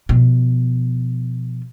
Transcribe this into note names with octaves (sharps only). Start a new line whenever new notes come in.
B2 F3